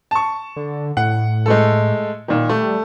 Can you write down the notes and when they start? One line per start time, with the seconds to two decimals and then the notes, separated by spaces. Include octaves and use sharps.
0.11 A5 C#6
0.57 D3
0.97 A2 F#5
1.46 G#3 A3 A4
2.28 A#2 D#3
2.49 G3 A3